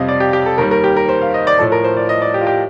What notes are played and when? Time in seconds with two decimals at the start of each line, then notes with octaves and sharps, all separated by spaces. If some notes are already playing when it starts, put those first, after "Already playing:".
Already playing: F2 C3 G3 D#5 F5
0.09 D5
0.20 G4
0.33 G4
0.46 A4
0.58 D#2 D#3 G3 A#4
0.71 A#4
0.84 G4
0.96 A#4
1.09 C5
1.21 F5
1.34 D#5
1.47 D5
1.59 A2 F3 A4
1.72 A#4
1.84 C5
1.97 D5
2.09 D#5
2.22 D5
2.34 G4
2.41 F4
2.47 G4